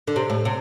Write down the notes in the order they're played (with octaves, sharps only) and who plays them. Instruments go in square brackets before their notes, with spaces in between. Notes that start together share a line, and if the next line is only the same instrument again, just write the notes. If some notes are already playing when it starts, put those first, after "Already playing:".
[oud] D3
C3
A2
C3